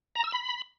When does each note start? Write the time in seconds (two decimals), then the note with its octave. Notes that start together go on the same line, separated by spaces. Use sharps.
0.15 A#5
0.24 E6
0.32 B5